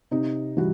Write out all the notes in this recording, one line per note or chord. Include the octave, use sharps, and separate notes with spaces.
C3 D#4
E3 G3 F#4